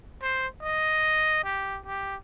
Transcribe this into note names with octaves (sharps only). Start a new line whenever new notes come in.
C5
D#5
G4
G4